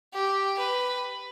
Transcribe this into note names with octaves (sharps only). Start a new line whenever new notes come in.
G4
B4